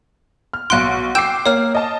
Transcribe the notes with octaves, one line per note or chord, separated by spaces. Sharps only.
F6
B1 F#5 C6 F#6 D7
G5 D6 E6 G6 C7 E7
A#3 C#5 F6
D#5 A5